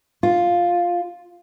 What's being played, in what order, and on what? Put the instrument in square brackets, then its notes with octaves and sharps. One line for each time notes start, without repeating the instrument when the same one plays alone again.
[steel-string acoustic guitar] F4